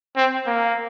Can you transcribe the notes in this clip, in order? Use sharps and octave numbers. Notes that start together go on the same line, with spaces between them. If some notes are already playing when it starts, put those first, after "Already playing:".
C4
A#3